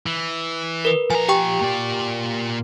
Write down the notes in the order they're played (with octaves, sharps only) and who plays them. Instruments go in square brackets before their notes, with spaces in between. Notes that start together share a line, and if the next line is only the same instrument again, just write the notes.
[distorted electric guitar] E3
[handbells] A#4 B4
[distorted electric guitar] F3 A#5 [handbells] G#5
[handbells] G4 G5 C#6
[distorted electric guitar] A#2 D5